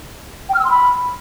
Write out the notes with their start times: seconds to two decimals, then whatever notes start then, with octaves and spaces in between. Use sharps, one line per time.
0.49 G5
0.54 F6
0.59 E6
0.64 C6
0.69 B5